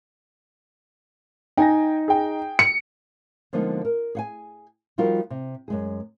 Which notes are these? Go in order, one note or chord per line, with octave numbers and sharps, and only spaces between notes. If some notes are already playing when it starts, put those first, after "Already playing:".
D#4 G5 G#5 A#6
G#4 G5
C#7
D3 F3 G#3 A#3 B3 D#4
A#4
G#4 F#5 G#5
F3 G3 D#4 F4 F#4 A#4
C3
F#2 G#3 G#4